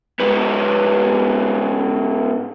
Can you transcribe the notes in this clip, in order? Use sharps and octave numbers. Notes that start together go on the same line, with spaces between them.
G#2 B3